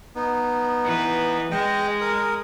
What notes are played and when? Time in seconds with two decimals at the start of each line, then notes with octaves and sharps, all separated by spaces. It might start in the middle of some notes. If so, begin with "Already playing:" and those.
0.16 B3 D#4
0.84 E3 B4
1.52 G#3 D#5 G5
2.01 A#4 D#6